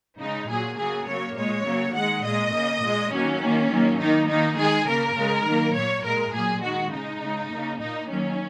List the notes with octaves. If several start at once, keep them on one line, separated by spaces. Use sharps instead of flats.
C#3 G#3 D#4
A#2 F#3 A#3 G#4
C#3 F#3 A#3 G#4
C#3 F#3 A#3 C#5
A#2 G#3 C#5
C#3 F#3 A#3
D#3 G#3 F#5
A#2 G#3 D#5
C#3 A#3
A#2 G#3
D#3 F#3 A#3 C#4
D#3 A#3
D#3 F#3 A#3
D#3 A#3 D#4
D#3 A#3 D#4
D#3 G#3 G#4
C#3 A#3 A#4
C#3 G#3
D#3 F#3 A#3
A#2 A#3 C#5
A#2 G#3 A#4
A#2 F#3 A#3 G#4
D#3 G#3 F#4
C#3 G#3 D#4
C#3 G#3
C#3 A#3
A#2 A#3 D#4
D#3 F#3 A#3 C#4